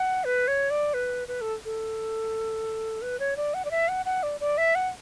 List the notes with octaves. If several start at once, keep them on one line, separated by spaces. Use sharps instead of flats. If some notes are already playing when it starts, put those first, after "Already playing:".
Already playing: F#5
B4
C#5
D5
B4
B4
A4
A4
B4
C#5
D5
F#5
D5
E5
F#5
F#5
D5
D5
E5
F#5